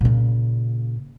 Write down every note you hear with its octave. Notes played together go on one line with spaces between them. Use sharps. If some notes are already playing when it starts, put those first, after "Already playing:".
A#2 C#3